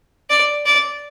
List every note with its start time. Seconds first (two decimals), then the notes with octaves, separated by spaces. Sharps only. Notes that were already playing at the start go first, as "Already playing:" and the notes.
0.30 D5
0.66 D5